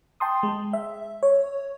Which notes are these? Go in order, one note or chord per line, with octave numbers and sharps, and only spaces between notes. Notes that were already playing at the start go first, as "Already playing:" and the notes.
G5 A5 C6 D#6
G#3
E5
C#5